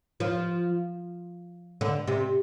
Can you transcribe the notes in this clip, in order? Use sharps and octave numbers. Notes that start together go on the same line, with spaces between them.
F3
D3
C3